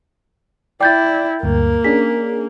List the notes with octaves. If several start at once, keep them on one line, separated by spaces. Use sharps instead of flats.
E4 D5 G5 G6 A6
D2 G2 A#3
C#4 D4 G#4 B6